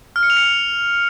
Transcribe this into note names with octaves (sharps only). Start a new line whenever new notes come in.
F6
C#7
F7
C#7